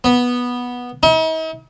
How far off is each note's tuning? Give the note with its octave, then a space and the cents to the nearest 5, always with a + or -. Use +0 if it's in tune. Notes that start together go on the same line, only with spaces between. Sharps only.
B3 -10
D#4 +45